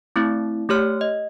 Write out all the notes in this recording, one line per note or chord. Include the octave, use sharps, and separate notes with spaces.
A3 C4 E4
A3 G4 C#5 F6
D#5